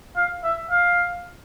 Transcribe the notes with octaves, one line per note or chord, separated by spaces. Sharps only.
F5
E5
F5